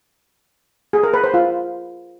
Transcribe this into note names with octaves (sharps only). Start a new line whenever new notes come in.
G#4
A#4
B4
C5
F4